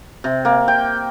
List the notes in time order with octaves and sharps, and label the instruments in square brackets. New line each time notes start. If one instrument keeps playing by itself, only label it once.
[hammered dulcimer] C3
A#3
G5